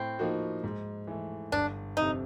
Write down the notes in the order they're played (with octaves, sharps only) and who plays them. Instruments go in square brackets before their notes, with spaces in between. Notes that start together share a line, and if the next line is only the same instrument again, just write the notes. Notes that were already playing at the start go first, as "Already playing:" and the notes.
Already playing: [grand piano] A2 [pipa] C4
[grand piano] F3 A#3 D#4 F#4
G#2
E3 A3
[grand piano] G1 [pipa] D4
[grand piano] F2 C3 [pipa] D#4